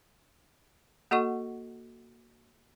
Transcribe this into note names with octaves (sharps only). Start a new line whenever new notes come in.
A#3 F#4 A4 D#5 F#5 C#6